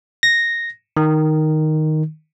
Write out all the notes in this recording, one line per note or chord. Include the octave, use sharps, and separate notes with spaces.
A#6
D#3